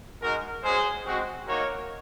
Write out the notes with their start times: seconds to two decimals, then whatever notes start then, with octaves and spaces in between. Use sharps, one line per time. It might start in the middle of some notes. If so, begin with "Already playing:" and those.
0.21 G#3 D#4 F#4 A#4
0.62 G#3 C#4 F#4 G#4 C5
1.05 G#3 C4 F#4
1.46 A#3 D#4 F#4 A#4 C#5